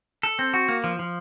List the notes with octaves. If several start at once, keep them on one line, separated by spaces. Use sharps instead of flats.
A4
C4
F#4
A#3
F3
F3